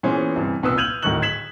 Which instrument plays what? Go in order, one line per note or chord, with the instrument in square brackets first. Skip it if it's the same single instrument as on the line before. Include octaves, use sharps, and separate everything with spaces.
[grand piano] A#2 E3 B3 C#4 G#4 C5
G2 C3 E3
C2 A#2 B3 B4 D#6 E6
F6 G6 G#6 D#7 F7 F#7
D1 D2 D#3 C#6 F#6 F#7
G#6 B6 E7 F#7